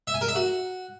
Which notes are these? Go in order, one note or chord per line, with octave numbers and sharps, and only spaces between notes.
E5
G#5
A#4
E5
F#4